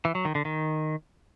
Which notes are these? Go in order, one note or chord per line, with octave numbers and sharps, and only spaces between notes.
E3
F#3
D#3
D3
D#3